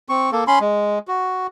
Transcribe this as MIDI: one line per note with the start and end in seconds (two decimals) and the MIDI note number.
0.09 0.30 60
0.09 0.30 85
0.32 0.44 58
0.32 0.44 69
0.47 0.59 61
0.47 0.59 83
0.47 0.59 84
0.61 0.99 56
1.08 1.47 66